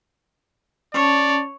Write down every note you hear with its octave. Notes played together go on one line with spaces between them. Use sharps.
C#4 C#5 D5 A5